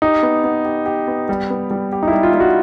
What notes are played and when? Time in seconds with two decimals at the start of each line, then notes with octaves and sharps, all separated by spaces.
0.02 D#4 G4
0.23 B3
0.44 B3
0.65 G4
0.86 G4
1.08 B3
1.29 G3
1.50 B3
1.71 G3
1.92 G4
2.03 D#4
2.08 E4
2.13 G3
2.23 F4
2.34 G3
2.40 F#4